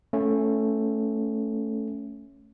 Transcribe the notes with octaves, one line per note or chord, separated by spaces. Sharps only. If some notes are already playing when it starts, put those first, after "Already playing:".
A3 C#4